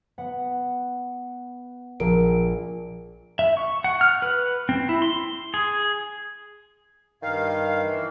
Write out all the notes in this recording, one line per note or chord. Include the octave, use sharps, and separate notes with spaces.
B3 F#5
A#1 G#4 A#4 D7
E5
C#6
F#5
F6
B4
C4
E4
C6
G#4
G2 D#3 F5
E3